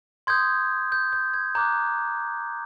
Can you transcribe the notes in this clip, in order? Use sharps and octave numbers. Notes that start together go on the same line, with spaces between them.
C6 D#6 G6 G#6
G6
G6
G#6
A#5 D6 F#6 G6